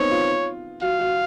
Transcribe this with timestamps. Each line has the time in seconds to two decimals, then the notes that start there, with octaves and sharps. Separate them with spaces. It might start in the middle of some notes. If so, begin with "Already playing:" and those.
Already playing: B3 C4 D#4 C#5
0.11 F4
0.82 F#4 F5
0.99 F#4